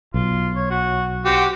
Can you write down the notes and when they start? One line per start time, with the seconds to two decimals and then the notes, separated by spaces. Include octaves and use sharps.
0.14 B1 F4
0.55 C#5
0.70 F#4
1.25 C4 F#4 G4